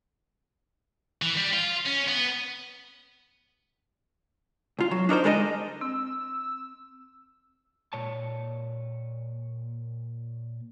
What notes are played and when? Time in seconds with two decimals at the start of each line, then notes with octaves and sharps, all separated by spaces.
1.22 E3
1.37 G3
1.53 F4
1.85 C#4
2.07 B3
4.79 C2 F4
4.91 F#3
5.09 D4 D#4 A#4 C5
5.24 G3 G#3 A4 A#4 C#5 D#5
5.81 C4 E6
7.93 A#2 C#5 A5